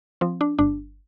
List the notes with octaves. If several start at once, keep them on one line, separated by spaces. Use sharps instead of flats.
F3 C4
D4
G1 D4